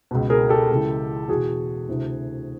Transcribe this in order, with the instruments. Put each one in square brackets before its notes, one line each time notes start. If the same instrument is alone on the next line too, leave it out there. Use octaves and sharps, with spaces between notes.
[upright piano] C#2 B2
G#4 A#4
G4 A4
C#2 C#3 E3
E2 B2 F#4 G#4
D2 C3 E3